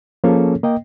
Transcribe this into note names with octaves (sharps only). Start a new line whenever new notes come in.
F3 A#3 C#4 G#4 A4 C#5
A#3 D#5 G5